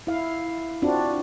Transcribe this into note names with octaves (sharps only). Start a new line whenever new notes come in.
E4 F5
C4 D4 F4 F#4